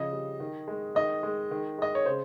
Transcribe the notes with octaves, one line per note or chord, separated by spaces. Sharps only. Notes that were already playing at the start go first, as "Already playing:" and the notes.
Already playing: C#3 F3 D#5
G3
D#3
G#3
D#3 D#5
G#3
D#3
G#3 D#5
C#5
C#3 C5